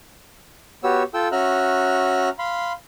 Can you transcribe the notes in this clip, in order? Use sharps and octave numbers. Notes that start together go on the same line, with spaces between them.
B3 F#4 G4 C#5 E6
F4 A4 G5 E6
C#4 F#4 E5 A#5 F6 F#6
F5 B5 C6